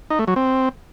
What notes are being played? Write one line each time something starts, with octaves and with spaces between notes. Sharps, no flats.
D#4
A3
F#3
C4